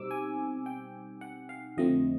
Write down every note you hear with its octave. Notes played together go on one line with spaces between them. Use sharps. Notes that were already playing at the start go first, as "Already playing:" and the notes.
Already playing: B2 G3 C4 D#4 D6 E6
G#5
G5
F#5
F5
F2 D3 F3 A3 C4 D#5